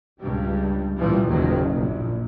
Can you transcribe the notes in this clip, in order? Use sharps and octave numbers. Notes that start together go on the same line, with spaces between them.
C#2 G2 G3
F#2 A#2 E3 F3 G3
F#1 D#2 A#2 D#3 F#3
A#1